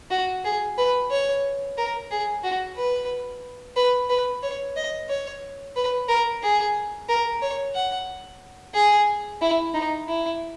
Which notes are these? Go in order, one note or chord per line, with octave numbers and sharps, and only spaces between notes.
F#4
G#4
B4
C#5
A#4
G#4
F#4
B4
B4
B4
C#5
D#5
C#5
B4
A#4
G#4
A#4
C#5
F#5
G#4
E4
D#4
E4